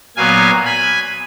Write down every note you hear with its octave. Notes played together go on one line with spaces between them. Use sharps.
A#2 F#3 B3 F5 G#5
G#5 B5